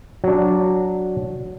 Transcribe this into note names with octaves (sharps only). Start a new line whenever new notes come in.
F#3 D4